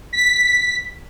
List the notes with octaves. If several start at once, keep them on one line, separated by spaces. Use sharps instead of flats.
B6